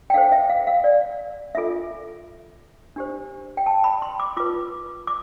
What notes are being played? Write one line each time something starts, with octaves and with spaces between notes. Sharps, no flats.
G5
D4 A4 C5 F5
E5
F5
F5
D5
D4 F4 A4 E5
D4 G4 C5
G5
A5
B5
C6
D6
F4 B4 D6
D6